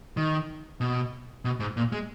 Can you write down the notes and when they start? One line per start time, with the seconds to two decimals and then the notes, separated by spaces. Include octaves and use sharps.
0.17 D#3
0.81 B2
1.45 B2
1.60 G#2
1.77 A#2
1.92 G#3